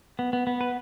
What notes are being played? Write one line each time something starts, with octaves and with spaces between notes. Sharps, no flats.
B3
B3
B3
B4